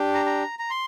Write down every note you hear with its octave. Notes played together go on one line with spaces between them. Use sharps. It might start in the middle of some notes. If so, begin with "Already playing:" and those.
Already playing: D4 G4
A#5
A#5
A#5
C6